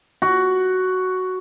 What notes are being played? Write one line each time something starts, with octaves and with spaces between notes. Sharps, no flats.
F#4